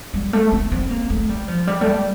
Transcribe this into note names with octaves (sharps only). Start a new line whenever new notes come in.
G3
A3
C4
C4
A#3
A3
G3
F3
G3
A3
G3